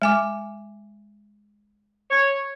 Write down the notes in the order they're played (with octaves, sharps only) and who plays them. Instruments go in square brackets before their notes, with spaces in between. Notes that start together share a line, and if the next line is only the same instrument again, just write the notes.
[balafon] G#3 G#5 D6
[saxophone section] C#5